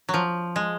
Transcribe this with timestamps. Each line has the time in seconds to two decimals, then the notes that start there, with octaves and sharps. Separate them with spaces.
0.09 F#3
0.14 F3
0.56 G#3